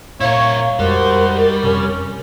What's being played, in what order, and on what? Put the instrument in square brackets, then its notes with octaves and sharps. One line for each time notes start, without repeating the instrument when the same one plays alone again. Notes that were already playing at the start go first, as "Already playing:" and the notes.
[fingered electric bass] A#2 [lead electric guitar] E4 A#4 [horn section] C#5 [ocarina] F5
[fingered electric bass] F2 G#3 [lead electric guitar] G3 [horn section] D#4 F#4 C5 [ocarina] A#4
[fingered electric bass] F2 C3 [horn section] C#4